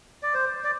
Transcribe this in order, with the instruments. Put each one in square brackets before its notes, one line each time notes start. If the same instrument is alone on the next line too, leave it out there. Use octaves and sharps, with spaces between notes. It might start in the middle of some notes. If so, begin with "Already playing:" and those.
[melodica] D5
C5
D5